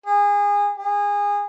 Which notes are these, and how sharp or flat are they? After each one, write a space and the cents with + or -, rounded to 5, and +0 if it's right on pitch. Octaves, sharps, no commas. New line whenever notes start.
G#4 -25
G#4 -25